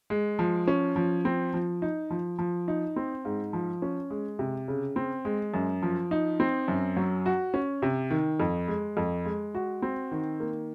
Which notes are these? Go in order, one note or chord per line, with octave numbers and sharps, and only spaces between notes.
G#3
F3
C#4
F3
C4
F3
D#4
F3
F3
D#4
C4
G#2
F3
C#4
G#3
C3
C#3
C4
G#3
F#2
F3
D#4
C4
F#2
F#3
F#4
C#4
C3
D#3
F2
G#3
F2
G#3
F#4
C4
D#3
A#3